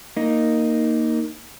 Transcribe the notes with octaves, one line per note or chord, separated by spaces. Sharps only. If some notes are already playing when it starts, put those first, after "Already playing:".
A#3 D#4